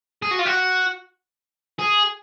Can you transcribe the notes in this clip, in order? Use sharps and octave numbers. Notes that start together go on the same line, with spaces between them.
G#4
F#4
F4
F#4
G#4